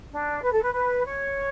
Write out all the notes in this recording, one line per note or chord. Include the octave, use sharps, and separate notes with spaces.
D4
B4
A4
B4
B4
C#5